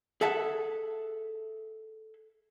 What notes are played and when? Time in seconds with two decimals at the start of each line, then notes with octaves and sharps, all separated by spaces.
0.21 G#4 A4 E5 F#5 A5